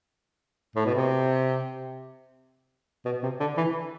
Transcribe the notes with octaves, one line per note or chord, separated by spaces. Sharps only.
A2
B2
C3
B2
C3
D3
E3